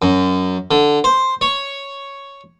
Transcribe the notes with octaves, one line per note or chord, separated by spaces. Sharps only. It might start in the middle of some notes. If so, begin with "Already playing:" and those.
F#2
D3
C5
C#5